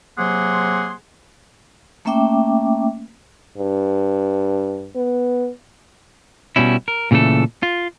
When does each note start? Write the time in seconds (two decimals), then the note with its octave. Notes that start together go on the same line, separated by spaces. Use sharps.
0.19 C3 F#3 A#3 G#4 F#5 C6
2.05 A3 A#3 C#4 E5 G5 D6
3.58 G2
4.95 B3
6.56 B2 G3 C#4 E4
6.88 A#4
7.11 A#2 C#3 E3 A3 A4
7.63 F4